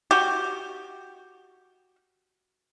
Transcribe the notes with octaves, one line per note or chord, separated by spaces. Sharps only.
F#4 G4